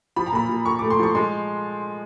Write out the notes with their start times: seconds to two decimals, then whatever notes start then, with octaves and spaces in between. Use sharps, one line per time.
0.16 F3 B5
0.26 A#5
0.32 A#2 B5
0.49 A#2
0.66 A#2 C#6
0.79 A3 D6
0.90 C6
0.99 F3 C#6
1.15 G#3 C6